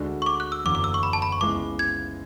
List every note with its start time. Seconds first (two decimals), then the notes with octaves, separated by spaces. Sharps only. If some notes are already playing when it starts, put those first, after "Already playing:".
Already playing: D2 D3 G#3 D4 F#4
0.22 C#6
0.26 D6
0.40 F#6
0.52 E6
0.65 F#1 E2 D3 F#3 D6
0.75 D6
0.84 E6
0.94 C#6
1.03 B5
1.13 A5
1.22 B5
1.32 C#6
1.41 C#2 C#3 G#3 B3 E4 D6
1.79 G#6